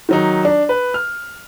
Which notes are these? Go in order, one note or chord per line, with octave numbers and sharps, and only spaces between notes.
D#3 F#3 D#4
D4
B4
F6